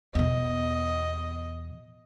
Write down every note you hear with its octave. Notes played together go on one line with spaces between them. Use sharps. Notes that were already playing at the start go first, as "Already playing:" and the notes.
E2 B2 D#5